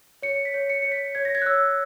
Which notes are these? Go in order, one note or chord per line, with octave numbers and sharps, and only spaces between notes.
C#5 C#7
B6
C#5
C#7
C#5 C#7
B6
C#5 G#6
A#6
G#6
F#6
C#5 E6